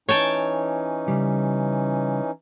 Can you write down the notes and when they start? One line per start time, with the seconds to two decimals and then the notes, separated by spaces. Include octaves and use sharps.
0.09 E3 C#4 D#4 C#5 G5 A5
1.08 C#3 G3